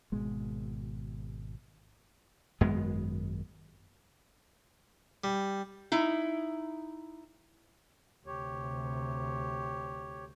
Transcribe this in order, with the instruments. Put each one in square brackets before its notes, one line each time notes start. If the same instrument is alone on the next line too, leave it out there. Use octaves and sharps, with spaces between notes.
[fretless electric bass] G#1 B2 G#3
[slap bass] G#1 F#2 G#3 B3
[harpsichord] G3
[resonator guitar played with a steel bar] D#4 E4
[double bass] D2 C3 [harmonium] G4 C#5